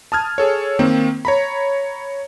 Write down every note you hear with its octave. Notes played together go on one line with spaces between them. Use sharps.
A5 D#6 F6 G#6
G#4 A4 C#5
D#3 A#3 C4
C#5 A#5 B5